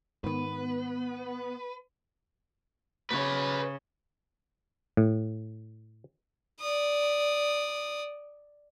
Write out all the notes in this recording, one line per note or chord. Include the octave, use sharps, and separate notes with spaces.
G#2 D#3 B3 B4
C#3 B4 C#5
A2
D5 D#6